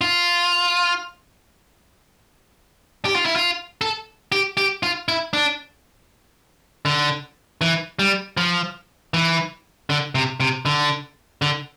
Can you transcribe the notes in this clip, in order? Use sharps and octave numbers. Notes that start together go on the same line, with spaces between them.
F4
G4
F4
E4
F4
A4
G4
G4
F4
E4
D4
D3
E3
G3
F3
E3
D3
C3
C3
D3
D3